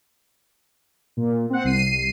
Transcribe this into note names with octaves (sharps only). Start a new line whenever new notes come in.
A#2
C4 F#5
C2 C7 D#7